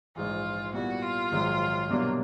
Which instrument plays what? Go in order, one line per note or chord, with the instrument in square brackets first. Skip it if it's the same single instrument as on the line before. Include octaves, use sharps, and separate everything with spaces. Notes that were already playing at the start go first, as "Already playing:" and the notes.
[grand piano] A#1 G#2 E3 [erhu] F4
[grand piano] A#2 G3 B3 E4 [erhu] F#4
[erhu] F4
[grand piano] A#1 G#2 D#3 F#3
C2 B2 F#3 A#3 D4